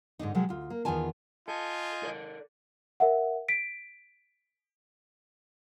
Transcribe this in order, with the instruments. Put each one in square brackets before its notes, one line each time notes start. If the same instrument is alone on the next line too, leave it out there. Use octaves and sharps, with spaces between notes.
[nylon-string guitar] G#2 D3 D4 D#4
C3 F3 F#3 G#3
D2 F4
A#3
E2 D#3 B3 F4 G#5 A5
[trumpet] F4 [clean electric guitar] A4 [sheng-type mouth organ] D#5 G#5 G6
[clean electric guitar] A4 A#4 D5
[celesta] A#4 E5 F#5
B6 D7